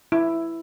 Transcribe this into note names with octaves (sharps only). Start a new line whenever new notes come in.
E4